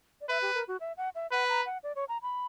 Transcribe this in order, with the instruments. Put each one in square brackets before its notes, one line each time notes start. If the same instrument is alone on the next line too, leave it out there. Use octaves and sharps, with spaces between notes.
[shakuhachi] D5
[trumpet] B4 [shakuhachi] E5
[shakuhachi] G4
A#4
F#4
E5
F#5
E5
[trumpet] B4 [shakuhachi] F#5
[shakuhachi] A#5
F#5
D5
C#5
A#5
B5